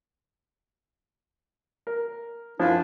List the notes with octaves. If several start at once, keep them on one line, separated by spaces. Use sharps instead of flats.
A#4
F#2 F3 D4 E4 F4